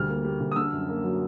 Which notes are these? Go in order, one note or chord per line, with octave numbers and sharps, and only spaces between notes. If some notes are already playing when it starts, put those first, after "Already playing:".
Already playing: D2 G3 F6
A#3
G3
D2
D#6
D3 E6
F#2
A#3
F#3